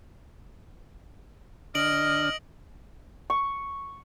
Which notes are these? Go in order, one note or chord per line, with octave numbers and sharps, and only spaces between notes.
D3 D4 D#5 F6 D7 F#7
C#6